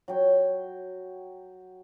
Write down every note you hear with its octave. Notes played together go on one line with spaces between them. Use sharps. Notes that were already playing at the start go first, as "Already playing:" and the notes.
F#3 G5 C#6